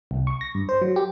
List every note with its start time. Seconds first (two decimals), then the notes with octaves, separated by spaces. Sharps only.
0.11 C2
0.27 C#6
0.41 A#6
0.55 G2
0.69 C5
0.82 F#3
0.96 G4